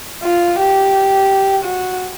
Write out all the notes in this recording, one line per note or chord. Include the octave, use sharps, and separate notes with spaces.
F4
G4
F#4